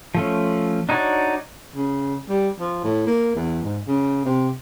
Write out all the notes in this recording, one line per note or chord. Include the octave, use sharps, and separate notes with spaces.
F3 A3 C#4
D4 D#4 F#4 C#5 D5
C#3
G3
F3
A2
A#3
E2
G#2
C#3
C3